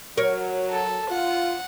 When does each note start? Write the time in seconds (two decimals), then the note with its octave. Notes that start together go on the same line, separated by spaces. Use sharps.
0.17 F#3 A#4 C#5
0.71 A4
1.10 F4 F#5